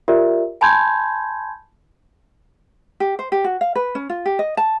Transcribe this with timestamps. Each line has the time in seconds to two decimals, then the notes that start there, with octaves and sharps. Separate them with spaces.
0.08 F4 G4 A#4 D5 E5
0.61 G#5 A5 B5 C6 G6 G#6
3.00 G4
3.19 C5
3.32 G4
3.44 F#4
3.61 F5
3.75 B4
3.95 C#4
4.10 F4
4.26 G4
4.39 D#5
4.57 A5